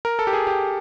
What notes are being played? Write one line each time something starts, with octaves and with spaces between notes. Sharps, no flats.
A#4
A4
G4
G#4
G4